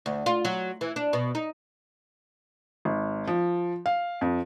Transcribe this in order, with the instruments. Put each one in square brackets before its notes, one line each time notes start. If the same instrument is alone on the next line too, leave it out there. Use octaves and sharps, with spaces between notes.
[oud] D2
F4
F#3
E3
D4
B2
D#4
[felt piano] G#1
F3
F5
F2